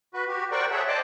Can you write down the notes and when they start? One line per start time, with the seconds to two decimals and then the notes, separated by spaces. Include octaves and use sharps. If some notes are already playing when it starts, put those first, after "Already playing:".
0.14 F#4 B4
0.28 F#4 G4
0.52 A#4 C5 D5 F#5 G5 C#6
0.71 G#4 A4 C#5 E5 F#5
0.88 C5 D5 D#5 G5 A5 D6